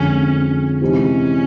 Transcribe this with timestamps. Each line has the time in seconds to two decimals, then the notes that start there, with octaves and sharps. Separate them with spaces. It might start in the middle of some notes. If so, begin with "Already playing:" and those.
Already playing: F2 D3 F3 G#3 C#4
0.81 C3 E3 G#3 C4 C#4 D#4